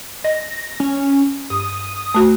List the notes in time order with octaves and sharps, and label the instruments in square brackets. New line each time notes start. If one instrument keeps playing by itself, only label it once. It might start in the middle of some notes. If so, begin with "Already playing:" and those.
[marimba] D#5 [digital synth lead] A#6
[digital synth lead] C#4
[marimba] G2 [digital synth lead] D#6
[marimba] A3 F#4